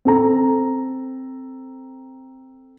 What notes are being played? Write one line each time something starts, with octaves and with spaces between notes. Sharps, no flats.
C4 A4 A#5